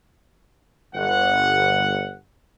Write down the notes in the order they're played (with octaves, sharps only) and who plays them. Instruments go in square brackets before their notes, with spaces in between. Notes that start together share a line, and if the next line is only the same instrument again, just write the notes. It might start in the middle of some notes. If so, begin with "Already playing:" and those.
[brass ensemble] G1 F#5